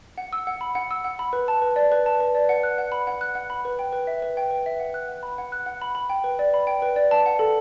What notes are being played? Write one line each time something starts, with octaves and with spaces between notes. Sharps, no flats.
F#5
E6
F#5
B5
F#5
E6
F#5
B5
B4
A5
B4
D5
B4
A5
B4
D5
F#5
F#6
F#5
B5
F#5
F#6
F#5
B5
B4
G5
B4
E5
B4
G5
B4
E5
F#5
F#6
F#5
B5
F#5
F#6
F#5
B5
B5
G5
B4
D5
B5
G5
B4
D5
A5
F#5
A4